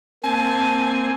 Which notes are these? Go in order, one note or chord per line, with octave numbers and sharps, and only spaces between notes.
A#3 C4 G#5 A5